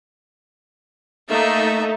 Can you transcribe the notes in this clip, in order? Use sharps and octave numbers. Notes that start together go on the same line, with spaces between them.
A3 A#3 D#4 E5